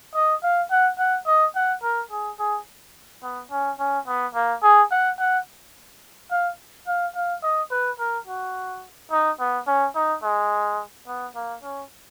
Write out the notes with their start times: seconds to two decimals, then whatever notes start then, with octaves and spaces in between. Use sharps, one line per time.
0.15 D#5
0.43 F5
0.71 F#5
0.99 F#5
1.26 D#5
1.55 F#5
1.83 A#4
2.11 G#4
2.39 G#4
3.23 B3
3.51 C#4
3.79 C#4
4.07 B3
4.35 A#3
4.63 G#4
4.91 F#5
5.19 F#5
6.31 F5
6.87 F5
7.15 F5
7.43 D#5
7.71 B4
7.99 A#4
8.27 F#4
9.11 D#4
9.39 B3
9.67 C#4
9.95 D#4
10.23 G#3
11.07 B3
11.35 A#3
11.63 C#4